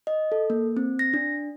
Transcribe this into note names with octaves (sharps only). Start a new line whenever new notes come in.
D#5
A4
A#3
C4
A#6
D4